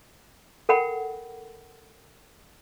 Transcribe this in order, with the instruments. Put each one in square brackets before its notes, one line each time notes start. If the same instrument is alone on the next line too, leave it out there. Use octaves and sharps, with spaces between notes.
[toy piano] A4 A#4 F#5 G5 B5